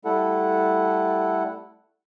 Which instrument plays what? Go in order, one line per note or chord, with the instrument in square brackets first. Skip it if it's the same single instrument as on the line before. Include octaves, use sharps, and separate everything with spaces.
[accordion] G3 A3 E4 A4 F#5